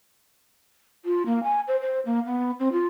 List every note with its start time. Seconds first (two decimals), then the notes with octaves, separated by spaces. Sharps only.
1.05 F4
1.26 A#3
1.43 G#5
1.68 C5
1.81 C5
2.06 A#3
2.26 B3
2.60 C4
2.72 F4